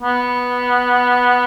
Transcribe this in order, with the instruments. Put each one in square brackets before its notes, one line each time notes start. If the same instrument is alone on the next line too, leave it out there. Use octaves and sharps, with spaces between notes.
[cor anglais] B3